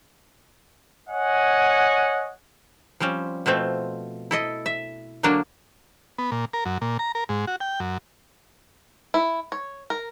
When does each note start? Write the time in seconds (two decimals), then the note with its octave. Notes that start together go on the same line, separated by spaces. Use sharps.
1.09 C#5 D#5 F#5 G#5
3.00 F3 G3 C4 C#4
3.46 B2 F3 A3 C4
4.31 E4 A4 D#5
4.66 E5
5.23 D3 F#3 A#3 D4
6.18 B3
6.32 A#2
6.53 A#4
6.65 F#2
6.81 A#2
6.99 A#5
7.15 A#4
7.29 G#2
7.47 F#4
7.60 G5
7.80 F#2
9.14 E4
9.52 C#5
9.90 A#4